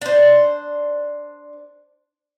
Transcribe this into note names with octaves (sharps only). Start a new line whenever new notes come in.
D4 C5